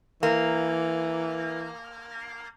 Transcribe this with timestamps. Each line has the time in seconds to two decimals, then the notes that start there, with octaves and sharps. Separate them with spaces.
0.23 E3 A#3